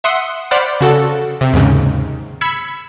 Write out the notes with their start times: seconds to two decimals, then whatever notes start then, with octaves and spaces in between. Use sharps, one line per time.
0.04 E5 F#5 C6 D#6 C#7
0.51 C5 D5 F#5 B5 D6 F6
0.81 C#3 F#4 A4
1.41 C3
1.53 D#2 G#2 C#3
2.41 B5 E6 G#6 C#7